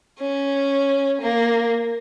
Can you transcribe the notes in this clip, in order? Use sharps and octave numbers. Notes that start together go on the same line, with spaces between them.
C#4
A#3